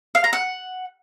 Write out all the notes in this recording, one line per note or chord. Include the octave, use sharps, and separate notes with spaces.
F5
A#5
F#5